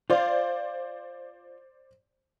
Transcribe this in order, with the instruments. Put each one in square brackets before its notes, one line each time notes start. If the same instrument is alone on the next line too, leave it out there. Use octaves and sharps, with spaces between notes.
[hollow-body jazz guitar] F4 [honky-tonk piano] C5 D5